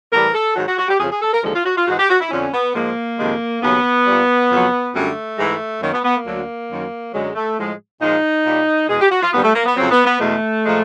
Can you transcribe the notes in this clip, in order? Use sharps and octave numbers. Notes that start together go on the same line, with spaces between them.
A2 E3 G3 A#4
A4
G#2 D#3 F#3 F#4
F#4
F#4
G4
F2 C#3 F3 G#4
G#4
A4
A#4
D#2 D3 F3 G#3 A4
F4
F#4
F4
G#2 E3 G#3 F#4
G4
F#4
E4
F2 D3 F3 C#4
B3
G#2 F3 G#3 A#3
F2 C3 D#3 G#3
D#2 C#3 F#3 B3
A#2 G3
F2 C#3 F#3
F#2 D3 G3 A3
G#2 E3 G#3
F#2 D#3 F#3 A#3
B3
B3
A#3
D2 D3 F#3
F#2 D#3 F#3
F#2 D3 F#3 G#3
A3
A2 F3 G#3
A#2 F3 G#3 D#4
A#2 G3
E2 B2 G#3 G#4
G4
F#4
F4
D#2 D3 G3 B3
A3
A#3
B3
F2 C#3 F#3 C4
B3
B3
E2 B2 G#3 A3
A#2 F3 G#3